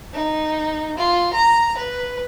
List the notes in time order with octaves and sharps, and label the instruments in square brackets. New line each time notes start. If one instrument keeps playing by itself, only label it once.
[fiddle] D#4
F4
A#5
B4